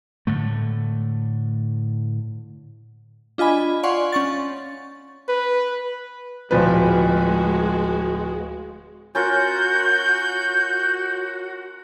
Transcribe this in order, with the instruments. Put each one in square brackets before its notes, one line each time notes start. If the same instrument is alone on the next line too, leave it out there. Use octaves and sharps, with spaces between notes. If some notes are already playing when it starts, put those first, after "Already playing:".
[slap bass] A2 D3 A3
[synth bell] D4 F4 D#5 G#5 B5
D5 F5 F#5 G#5 C6 C#6
C#4 C#6 A6
[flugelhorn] B4
[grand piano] D1 F3 B4 [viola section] G#3 F#4
[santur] C#4 F4 A#4 [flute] F#4 [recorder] G6